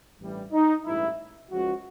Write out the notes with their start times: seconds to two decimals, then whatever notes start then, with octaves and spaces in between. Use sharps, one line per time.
0.20 A1 G2 E3 G3
0.52 D#4
0.85 A1 G2 E3 G#3 E4
1.49 C#2 C#3 F3 G#3 F#4